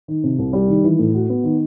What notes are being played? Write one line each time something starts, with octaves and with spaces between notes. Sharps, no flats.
D#3
C3
C2
G3
D#3
E3
A2
F#4
B3
D#3